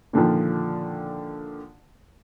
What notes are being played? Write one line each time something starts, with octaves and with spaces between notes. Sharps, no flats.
A#2 D3 D#3 F3